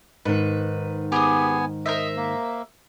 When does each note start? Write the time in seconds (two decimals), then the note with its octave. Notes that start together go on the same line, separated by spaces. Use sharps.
0.25 G#2 D#3 B4
1.12 B3 G4 G#4 G#5 D#6
1.86 A#4 C5 D#5 E5
2.17 A#3